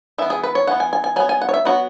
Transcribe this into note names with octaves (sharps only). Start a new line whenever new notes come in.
E3 B3 E5
G#4
B4
C#5
E3 B3 F#5
G#5
G#5
G#5
F#3 B3 G#5
G#5
F#5
C#5
E5
F#3 B3 F#4